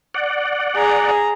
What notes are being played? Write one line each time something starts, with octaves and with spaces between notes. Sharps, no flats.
D5 F#5
G#4 A#5